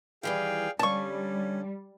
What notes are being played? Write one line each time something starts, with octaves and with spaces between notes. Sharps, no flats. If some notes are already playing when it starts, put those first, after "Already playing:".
D#3 E3 G3 G#4 F5 G5
D3 G3 C#4 F5 A5 C#6